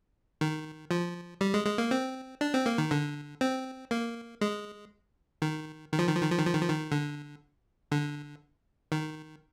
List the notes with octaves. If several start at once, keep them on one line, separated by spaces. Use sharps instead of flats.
D#3
F3
G3
G#3
G#3
A#3
C4
D4
C4
A#3
D#3
D3
C4
A#3
G#3
D#3
D#3
F3
D#3
F3
D#3
F3
D#3
F3
D#3
F3
D#3
D3
D3
D#3